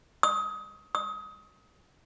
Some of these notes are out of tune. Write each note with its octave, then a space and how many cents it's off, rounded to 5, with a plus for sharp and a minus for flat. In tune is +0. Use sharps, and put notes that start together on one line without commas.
D#6 +30
D#6 +30